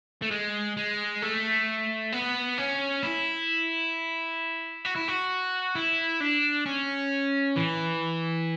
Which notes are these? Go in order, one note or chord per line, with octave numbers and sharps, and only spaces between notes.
A3
G#3
G#3
A3
B3
C#4
E4
F#4
E4
F#4
E4
D4
C#4
E3